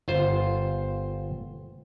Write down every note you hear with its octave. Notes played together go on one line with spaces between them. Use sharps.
G1 F4 C5